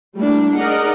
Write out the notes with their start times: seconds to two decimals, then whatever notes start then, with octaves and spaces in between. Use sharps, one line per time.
0.16 G3 A3 A#3 D4 E4
0.58 D#4 G#4 A#4 D5 D#5 F#5